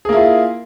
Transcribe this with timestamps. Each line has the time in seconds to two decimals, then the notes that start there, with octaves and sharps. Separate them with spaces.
0.05 G#4
0.09 A#3
0.13 E4
0.16 F4